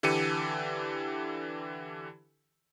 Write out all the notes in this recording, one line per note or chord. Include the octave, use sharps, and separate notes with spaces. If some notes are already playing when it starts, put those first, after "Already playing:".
D3 E3 G4 A4 C#7 D#7